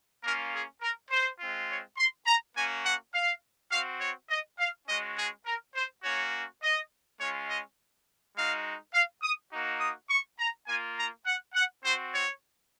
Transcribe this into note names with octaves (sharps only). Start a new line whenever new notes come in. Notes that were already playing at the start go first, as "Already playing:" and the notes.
A#3 C#4 F4 A#4
G#4
A#4
C5
G#3 C4 F4
C#5
C6
A#5
A#3 C#4 F#4 G#5
F#5
F5
C4 F#4 F5
C#5
D#5
F5
G#3 C#4 F#4 D#5
G#4
A#4
C5
A#3 C#4 F#4 C#5
D#5
G#3 C#4 F4 C#5
D#5
G#3 D#4 F#4 F5
F5
D#6
A#3 D#4 F#4
D#6
C#6
A#5
A#3 F4 G#5
A#5
F#5
F#5
C4 F#4 C5
C#5